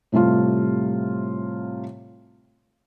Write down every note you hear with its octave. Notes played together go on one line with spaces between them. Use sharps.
A2 C3 G3 A3 F4